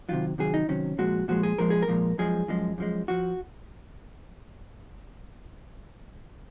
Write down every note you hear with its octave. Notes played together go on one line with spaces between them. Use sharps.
C3 D#3 F#3 F4
C3 D#3 F#3 G#4
D#4
C3 D#3 F#3 C#4
A#2 F3 G#3 F#4
A#2 F3 G#3 F#4
G#4
A#2 F3 G#3 A#4
G#4
A#4
A#2 F3 G#3
F#2 F3 G#3 G#4
F#2 F3 G#3
F#2 F3 G#3
F3 F#4